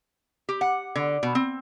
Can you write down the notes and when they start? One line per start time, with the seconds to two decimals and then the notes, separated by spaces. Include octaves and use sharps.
0.49 G4
0.61 F#5
0.96 D3
1.23 B2
1.35 C4